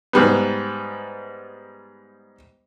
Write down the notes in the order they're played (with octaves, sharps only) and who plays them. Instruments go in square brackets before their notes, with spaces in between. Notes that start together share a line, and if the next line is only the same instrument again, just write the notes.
[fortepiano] G#2 G3 B3